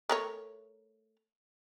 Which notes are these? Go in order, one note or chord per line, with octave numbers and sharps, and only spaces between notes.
A3 A#4 C#5